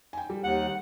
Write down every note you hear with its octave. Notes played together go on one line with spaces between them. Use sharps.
G5 G#5
G3
D#2 F#5